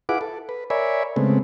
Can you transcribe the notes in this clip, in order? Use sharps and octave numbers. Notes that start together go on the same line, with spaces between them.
E4 F4 G#4 B4 F#5 D6
A4
B4
A#4 C#5 D5 E5 G#5 B5
C#3 G#3 A3 B3 C4